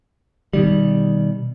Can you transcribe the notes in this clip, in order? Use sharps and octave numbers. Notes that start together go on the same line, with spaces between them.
B2 D#3 G3